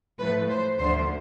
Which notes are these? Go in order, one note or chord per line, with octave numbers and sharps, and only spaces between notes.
A2 F3 A3 B4
C5
D2 D3 F3 A3 C5